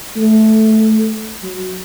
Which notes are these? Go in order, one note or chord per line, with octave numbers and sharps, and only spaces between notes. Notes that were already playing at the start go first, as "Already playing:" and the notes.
A3
F#3